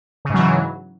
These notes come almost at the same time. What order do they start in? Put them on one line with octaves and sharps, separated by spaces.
C#3 G#2 F#3 E3